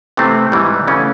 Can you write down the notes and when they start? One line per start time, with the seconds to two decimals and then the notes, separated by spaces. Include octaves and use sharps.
0.17 C3 E3 A3 C4
0.52 G#2 E3 G3
0.87 C#3 E3 A3 C#4